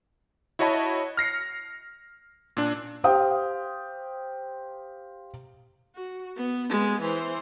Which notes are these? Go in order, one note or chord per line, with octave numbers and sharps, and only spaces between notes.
E4 F#4 C#5 D#5 A5 B5
F6 A#6 C7 C#7
A#2 D4
G4 C5 F5 G5 D#6
F#4
B3
G#3 B3
E3 C5